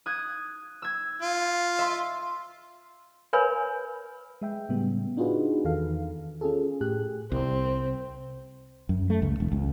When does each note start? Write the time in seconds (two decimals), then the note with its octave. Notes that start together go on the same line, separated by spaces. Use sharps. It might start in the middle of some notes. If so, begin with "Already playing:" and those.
0.06 D#6 F#6 G#6
0.82 E6 G#6
1.22 F4
1.79 E5 C6
3.33 A#4 B4 C#5 G#5 B5
4.42 G#3 E5 G5
4.69 A2 C#3 G3 B3
5.17 D4 D#4 F4 F#4 G#4 B4
5.65 E2 D#3 A4 F5
6.41 C#4 F4 G#4 A4
6.81 A2 G4 G#4 F#6
7.32 C2 C4
8.89 F#2
9.10 A3
9.22 C#2
9.40 E1
9.52 C#2